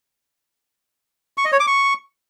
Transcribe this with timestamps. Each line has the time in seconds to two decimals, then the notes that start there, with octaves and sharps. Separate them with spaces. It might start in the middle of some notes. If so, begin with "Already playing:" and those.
1.38 C#6
1.45 D#5
1.52 C#5
1.60 D6
1.67 C#6